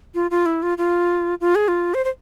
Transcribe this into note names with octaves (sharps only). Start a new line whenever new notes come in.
F4
F4
E4
F4
F4
F4
G#4
F4
C5
C5